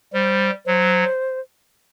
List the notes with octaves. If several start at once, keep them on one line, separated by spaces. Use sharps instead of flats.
G3 C5
F#3 C5